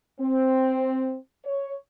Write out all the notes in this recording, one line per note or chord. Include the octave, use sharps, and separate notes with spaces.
C4
C#5